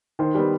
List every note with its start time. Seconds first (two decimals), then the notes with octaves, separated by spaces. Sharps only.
0.19 D#3 C5
0.35 G3 B3